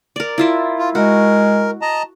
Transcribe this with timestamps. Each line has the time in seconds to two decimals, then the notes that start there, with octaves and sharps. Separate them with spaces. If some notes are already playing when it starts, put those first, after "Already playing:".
0.16 A#4 D5
0.38 E4 F4 E5
0.79 F4
0.95 G#3 F#4 A#4
1.82 D#5 A5 A#5